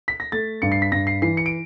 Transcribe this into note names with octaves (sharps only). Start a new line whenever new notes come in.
B6
A#6
A3 A6
G2 C#7
C7
B6
G2 A#6
C7
E3 C7
C#7
D7